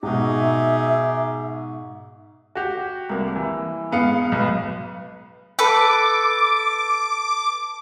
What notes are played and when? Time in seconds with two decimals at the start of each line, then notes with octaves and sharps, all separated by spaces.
0.03 G#2 B2 D#4 G#4 E5 D6
2.55 F#4 G4
3.09 C2 A#3
3.36 E3
3.92 G#2 B3 F5 C#7
4.32 B1 B4
5.59 A4 B4 D6